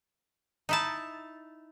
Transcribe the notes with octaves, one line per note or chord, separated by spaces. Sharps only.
D#4 E4 A5